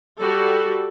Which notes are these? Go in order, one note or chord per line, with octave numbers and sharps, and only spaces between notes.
G3 F#4 G4 A4